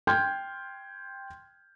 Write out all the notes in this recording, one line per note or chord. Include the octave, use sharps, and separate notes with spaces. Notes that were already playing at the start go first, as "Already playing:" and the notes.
G5 C6 F6 G6 G#6